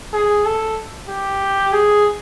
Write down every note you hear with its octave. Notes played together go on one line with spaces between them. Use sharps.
G#4
A4
G4
G#4